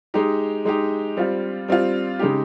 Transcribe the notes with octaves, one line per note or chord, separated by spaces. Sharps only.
G#3 D#4 G4
G#3 D#4 G4
G3 C4 F4
G3 C4 F4
C#3 G#3 D#4 G4